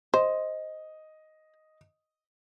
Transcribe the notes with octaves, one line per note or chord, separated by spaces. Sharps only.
C5 D#5